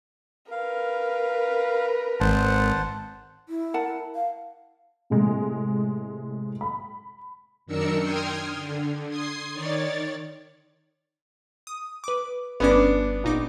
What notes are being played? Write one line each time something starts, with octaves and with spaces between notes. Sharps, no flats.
A#4 B4 F5
G#1 C5 F#5 A5
E4
A#4 F#5 A5
F5
A2 C3 G#3
B5
F#2 D#3 D4 A#4 E6 C#7
G5 C6 D#6 F6 G#6
D3
C6 D#6 G#6 C7
D#3 C#5 D5 A6
D#6
B4 D6
G1 B3 C#4 D4 D6
A#1 D#4 D6